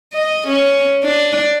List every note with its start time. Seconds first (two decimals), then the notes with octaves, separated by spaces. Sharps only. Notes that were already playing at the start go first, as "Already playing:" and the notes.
0.13 D#5
0.48 C#4
1.04 D4